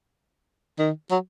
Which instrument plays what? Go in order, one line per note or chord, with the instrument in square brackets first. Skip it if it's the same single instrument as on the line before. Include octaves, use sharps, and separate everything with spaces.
[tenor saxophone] D#3
F#3